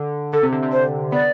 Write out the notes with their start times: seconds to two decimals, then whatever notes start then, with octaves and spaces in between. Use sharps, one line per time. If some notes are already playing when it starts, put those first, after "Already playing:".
Already playing: D3
0.33 D3 A4
0.43 C3
0.53 D3
0.63 C3
0.73 C5
1.12 B3 D5